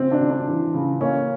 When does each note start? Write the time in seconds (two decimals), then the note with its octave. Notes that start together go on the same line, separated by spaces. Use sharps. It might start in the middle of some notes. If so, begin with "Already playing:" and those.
Already playing: C#3 C4
0.12 D4
0.21 C#3
0.29 D4
0.48 E3
0.74 C#3
1.01 A#3 C#4